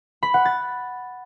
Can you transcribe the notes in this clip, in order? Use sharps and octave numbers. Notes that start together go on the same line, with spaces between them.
B5
F#5
A6